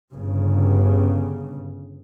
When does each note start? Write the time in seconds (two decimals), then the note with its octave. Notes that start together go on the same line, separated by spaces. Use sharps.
0.13 G1 G2 C#3